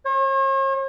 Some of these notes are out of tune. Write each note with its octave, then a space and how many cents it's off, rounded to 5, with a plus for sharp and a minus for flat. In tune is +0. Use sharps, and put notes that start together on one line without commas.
C#5 -45